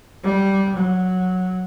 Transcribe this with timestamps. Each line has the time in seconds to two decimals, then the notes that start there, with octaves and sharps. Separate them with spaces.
0.24 G3
0.76 F#3